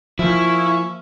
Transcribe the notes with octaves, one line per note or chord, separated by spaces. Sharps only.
F3 A#3 C#4 E4 C#6